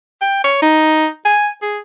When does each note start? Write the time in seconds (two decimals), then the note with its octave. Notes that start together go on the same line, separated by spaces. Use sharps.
0.22 G5
0.44 C#5
0.62 D#4
1.25 G#5
1.62 G#4